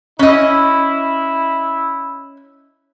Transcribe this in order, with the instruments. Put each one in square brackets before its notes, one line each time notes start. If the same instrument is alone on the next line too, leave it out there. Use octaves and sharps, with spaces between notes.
[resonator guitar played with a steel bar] C#4 D#5 [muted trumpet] E4